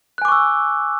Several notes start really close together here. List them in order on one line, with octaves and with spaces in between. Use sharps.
F#6 G#5 D6 C#6 E6